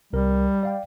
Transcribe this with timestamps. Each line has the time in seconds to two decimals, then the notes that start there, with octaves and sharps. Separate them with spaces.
0.13 C2 G3 A#4
0.63 D5 F5 G5